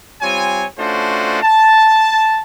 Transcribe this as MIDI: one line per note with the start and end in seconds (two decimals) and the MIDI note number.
0.22 0.65 55
0.22 0.65 60
0.22 0.65 65
0.22 0.65 73
0.22 0.65 80
0.78 1.40 57
0.78 1.40 61
0.78 1.40 62
0.78 1.40 65
0.78 1.40 66
0.78 1.40 72
1.42 2.42 81